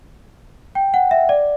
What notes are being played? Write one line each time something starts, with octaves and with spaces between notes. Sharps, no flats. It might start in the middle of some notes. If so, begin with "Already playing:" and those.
G5
F#5
E5
D5